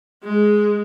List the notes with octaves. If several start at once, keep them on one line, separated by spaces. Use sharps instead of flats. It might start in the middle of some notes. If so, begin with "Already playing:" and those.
G#3